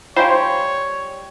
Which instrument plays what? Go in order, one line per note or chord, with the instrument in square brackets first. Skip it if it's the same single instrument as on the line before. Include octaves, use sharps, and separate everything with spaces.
[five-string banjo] G3 D#4 [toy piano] F4 F5 G#5 [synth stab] C5 [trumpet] C#5